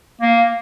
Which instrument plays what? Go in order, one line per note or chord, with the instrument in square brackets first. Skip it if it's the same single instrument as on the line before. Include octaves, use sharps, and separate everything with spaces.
[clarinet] A#3